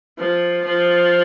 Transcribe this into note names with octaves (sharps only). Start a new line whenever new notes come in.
F3
F3